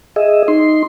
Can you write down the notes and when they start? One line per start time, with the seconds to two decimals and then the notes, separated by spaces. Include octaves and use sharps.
0.16 G#4 D#5 E5
0.48 D#4 C6